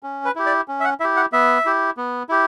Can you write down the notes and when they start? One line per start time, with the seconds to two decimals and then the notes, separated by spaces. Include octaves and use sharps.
0.03 C#4
0.25 B4
0.35 E4 G4
0.46 D5
0.68 C#4
0.80 E5
0.84 F#5
1.00 E4 E5
1.04 G4
1.16 F#5
1.32 B3 E5
1.65 E4 G4
1.97 B3
2.29 E4 G4